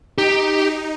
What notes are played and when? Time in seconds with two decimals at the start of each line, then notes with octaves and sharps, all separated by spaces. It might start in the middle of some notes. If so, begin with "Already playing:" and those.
0.18 D#4 G4
0.58 D#4